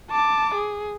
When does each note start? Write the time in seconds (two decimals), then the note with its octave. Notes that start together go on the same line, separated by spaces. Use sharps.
0.11 A5 D6
0.55 G#4